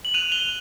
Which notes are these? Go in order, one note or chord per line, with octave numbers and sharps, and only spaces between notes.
F#7
F#6 D#7 F7
F7 G7
F#6